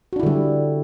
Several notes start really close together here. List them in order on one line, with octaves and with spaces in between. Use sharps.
F#4 D4 E4 D3 G3